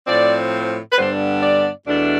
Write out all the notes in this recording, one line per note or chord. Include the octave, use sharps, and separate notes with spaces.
A2 F3 C4 D5
B4
G2 D3 G3 B3 D4 C5
D5
E2 B2 A3 D4